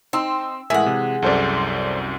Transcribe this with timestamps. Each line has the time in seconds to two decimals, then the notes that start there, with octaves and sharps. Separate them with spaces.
0.13 C4 D#4 C6 E6
0.70 A2 E3 G#3 G#4 A#4 E5 F#5
0.86 C3
1.22 C2 F#2 A4 C5 D5